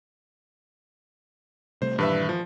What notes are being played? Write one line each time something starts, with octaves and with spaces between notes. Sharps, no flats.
C3 G3 A3 C5
G2 A#2 D#3 E3 B4 E5
F3